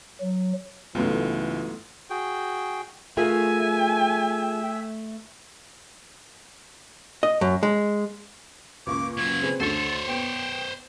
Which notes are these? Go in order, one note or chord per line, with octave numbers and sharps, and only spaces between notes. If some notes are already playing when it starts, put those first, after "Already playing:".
F#3
C#2 G#2 E3 F#3 A3 B3 F4
F#4 G#4 G5
A3 F4 G#4 A#4 E5 G#5
D#5
F#2
G#3
C#2 A#3 C#6 D6
C#3 F#3 G#6
C4 G#4 B4
D2 A4 C5 C#5
B3 G5